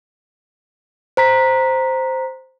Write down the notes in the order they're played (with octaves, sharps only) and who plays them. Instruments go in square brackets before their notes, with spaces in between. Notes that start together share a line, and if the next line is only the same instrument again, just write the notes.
[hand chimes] C5 A#5 B6